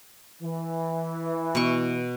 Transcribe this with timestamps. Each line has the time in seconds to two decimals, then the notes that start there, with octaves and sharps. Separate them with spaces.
0.42 E3
1.55 B2 C#6